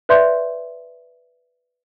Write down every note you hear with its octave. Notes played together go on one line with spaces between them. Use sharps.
B4 D5 E5 C6 G6